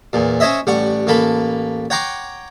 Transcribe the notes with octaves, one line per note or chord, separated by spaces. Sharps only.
E2 A#2
C#4 C5 C#5 D#5 E5
A1 G3 F#5 C#6
A1 A#3 A4 B5
C#5 F#5 G5 A#5 C6 D6